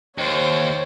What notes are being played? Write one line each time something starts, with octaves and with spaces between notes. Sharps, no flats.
D#2 C5 C#5